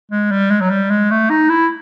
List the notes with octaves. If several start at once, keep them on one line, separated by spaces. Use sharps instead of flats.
G#3
G3
G#3
F#3
G3
G#3
A3
D#4
E4